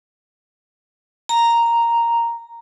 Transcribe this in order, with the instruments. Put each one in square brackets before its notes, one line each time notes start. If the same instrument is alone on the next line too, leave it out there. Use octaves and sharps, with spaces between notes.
[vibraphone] A#5